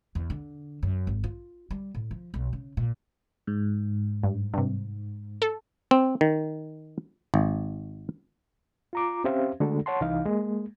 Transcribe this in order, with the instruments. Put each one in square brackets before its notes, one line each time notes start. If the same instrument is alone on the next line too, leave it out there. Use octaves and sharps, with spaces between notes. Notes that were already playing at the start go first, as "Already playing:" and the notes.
[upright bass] E2
D3
F#2
G#1
F4
G3
A2
F3
B1
C#3
A#2
[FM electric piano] G#2
[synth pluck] G2
G2 C3
A4
[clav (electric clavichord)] C4
D#3
G#1
[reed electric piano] F4 A#5 D6
C4 C#4 G4 C5 E5 F5
D3 G#3 A3 D4 F#4 A4
C#5 F#5 A5 C6
C2 E3 D#4 F5
G#3 A#3